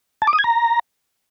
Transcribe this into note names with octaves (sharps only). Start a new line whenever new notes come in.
A5
D6
D#6
G#6
A#5